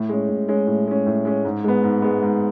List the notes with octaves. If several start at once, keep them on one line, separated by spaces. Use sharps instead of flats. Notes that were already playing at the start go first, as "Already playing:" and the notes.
Already playing: A2
G#3 C#4
A2
G#3 C#4
A2
G#3 C#4
A2
G#3 C#4
G#2
G#3 B3
G#2
G#3 B3
G#2